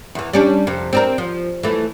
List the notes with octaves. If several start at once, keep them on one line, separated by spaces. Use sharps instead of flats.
E2 E3
G3 C#4 D4
F2 C3
C4 D4 A#4
F3
E3 A3